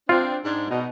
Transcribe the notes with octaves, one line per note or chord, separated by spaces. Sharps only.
C4 D4 F4
G#2 D4
B2 D#4